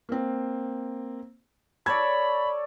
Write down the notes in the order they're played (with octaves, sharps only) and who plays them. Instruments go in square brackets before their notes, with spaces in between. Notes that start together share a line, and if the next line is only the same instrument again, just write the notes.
[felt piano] A#3 C4
[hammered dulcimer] A4 C#5 D5 [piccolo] B5 [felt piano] G#6